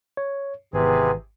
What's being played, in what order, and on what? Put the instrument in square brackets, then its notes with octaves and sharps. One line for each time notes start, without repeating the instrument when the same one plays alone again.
[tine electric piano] C#5
[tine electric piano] G#1 [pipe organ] C3 G#4 [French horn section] E3 B3 B4